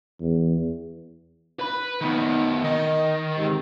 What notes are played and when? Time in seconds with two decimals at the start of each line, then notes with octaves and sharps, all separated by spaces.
0.20 E2
1.59 B4 B5
2.01 D#3 B3 D#4
2.64 D#3 D#5
3.37 G#2 C3